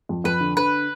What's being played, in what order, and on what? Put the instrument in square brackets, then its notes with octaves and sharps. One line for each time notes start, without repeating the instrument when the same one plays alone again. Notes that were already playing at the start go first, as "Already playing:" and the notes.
[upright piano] F2
[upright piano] F2 [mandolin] B4
[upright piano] D3
[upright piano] D3 [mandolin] B4